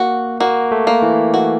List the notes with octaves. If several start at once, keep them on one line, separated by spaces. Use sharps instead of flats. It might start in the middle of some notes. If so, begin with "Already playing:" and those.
Already playing: A#3 F#4
A#3 F#4
A3
A#3
E3
F#4